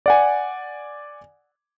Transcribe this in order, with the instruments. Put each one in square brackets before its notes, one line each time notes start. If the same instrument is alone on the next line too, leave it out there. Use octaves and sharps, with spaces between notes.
[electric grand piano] D5 F#5 G#5